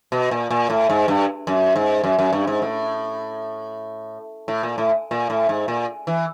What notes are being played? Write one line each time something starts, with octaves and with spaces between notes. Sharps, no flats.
B2
A#2
A#2
A2
G#2
G2
F#2
G#2
F#2
F#2
G2
G#2
A2
A2
A#2
A2
A#2
A2
G#2
A#2
E3